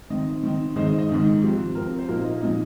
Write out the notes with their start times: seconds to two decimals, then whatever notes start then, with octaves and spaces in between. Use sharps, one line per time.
0.10 D#3 C4 D#4 D#5
0.43 D#3 C4 D#4
0.76 G#2 D#3 G#3 D#4 C5
0.87 D#5
0.99 D#5
1.09 G#2 D#3 G#3 D#4
1.43 C3 F3 C4
1.75 C3 F3 C4 A#4
1.99 C5
2.08 A#2 F3 A#3 D#4 A#4
2.25 D#5
2.41 A#2 F3 A#3 D#4 D#5